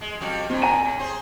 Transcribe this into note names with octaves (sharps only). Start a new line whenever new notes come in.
G#3
F2 G3 F#4
G2 C4 F4
G#5 A#5 D#7
A2
G#4 C5